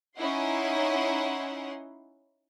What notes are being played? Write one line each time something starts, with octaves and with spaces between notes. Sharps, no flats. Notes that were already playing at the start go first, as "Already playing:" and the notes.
C#4 D#4 E4 F#5 C6